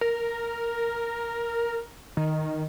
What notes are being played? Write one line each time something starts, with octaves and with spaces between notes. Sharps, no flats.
A#4
D#3